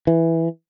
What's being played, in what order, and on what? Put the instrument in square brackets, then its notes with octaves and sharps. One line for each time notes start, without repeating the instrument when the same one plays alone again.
[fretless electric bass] E3